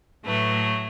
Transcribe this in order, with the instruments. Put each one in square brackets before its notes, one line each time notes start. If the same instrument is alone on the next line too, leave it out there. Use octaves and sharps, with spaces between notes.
[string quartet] A2 F#3 A3 B4